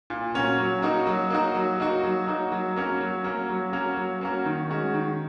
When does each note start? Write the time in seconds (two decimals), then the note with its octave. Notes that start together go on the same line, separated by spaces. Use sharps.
0.10 A#2
0.34 A#3 C#4 F#4
0.59 F#3
0.82 A#3 D#4 F#4
1.07 F#3
1.30 A#3 D#4 F#4
1.55 F#3
1.80 A#3 D#4 F#4
2.03 F#3
2.27 A#3 D#4 F#4
2.52 F#3
2.76 A#3 C#4 F#4
3.00 F#3
3.24 A#3 C#4 F#4
3.49 F#3
3.73 A#3 C#4 F#4
3.97 F#3
4.21 A#3 C#4 F#4
4.45 D#3
4.70 G#3 C#4 F#4
4.94 D#3